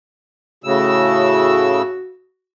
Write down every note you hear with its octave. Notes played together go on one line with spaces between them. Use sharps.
A2 C#3 F#4 E6